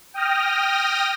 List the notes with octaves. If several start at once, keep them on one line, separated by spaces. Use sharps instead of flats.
G5 D#6 F6 A#6